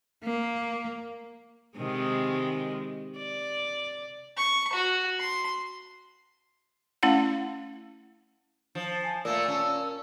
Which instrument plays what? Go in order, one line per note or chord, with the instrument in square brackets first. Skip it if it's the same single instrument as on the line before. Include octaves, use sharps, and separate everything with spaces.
[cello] A#3
[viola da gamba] C3 D#3 G#3
D5
[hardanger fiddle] C#6
F#4
C6
[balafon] A3 C#4 E4 F5 F#5
[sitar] F3
[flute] G#5
[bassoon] A#2 [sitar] A3 A#3 [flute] E6
[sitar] C#4